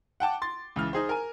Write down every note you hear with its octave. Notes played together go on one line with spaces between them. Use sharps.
F#5 G5 A5 D6
C6 A6
C#2 E3 F6
D#4 G#4 C5
A#4 G#5